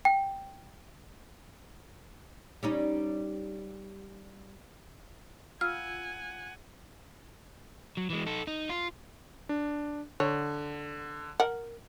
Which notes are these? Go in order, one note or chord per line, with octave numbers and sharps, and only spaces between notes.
G5
G3 C#4 D#4
F4 F5 F#5 G#5 E6 F6
F#3
E3 G#3
D#4 A4
D#4
F4
D4
D3 C#5
A#4 F#5